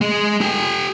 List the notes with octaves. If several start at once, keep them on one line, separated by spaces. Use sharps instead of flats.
G#3 G#4
G4 G#5